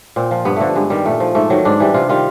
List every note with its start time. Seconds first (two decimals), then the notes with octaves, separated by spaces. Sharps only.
0.16 A#2 C4
0.31 F3
0.45 G2 B3
0.56 D3 F3 A3
0.75 G2 G#3
0.90 D#3 G3
1.05 A#2 A3
1.20 F3
1.35 G#2 A3
1.50 D#3 F#3
1.65 G#2 D4
1.80 E3 G3
1.94 C3 F4
2.09 D#3 G3 F4